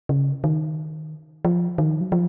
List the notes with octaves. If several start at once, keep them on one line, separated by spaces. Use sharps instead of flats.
C#3
D#3
F3
D#3
F#3
F3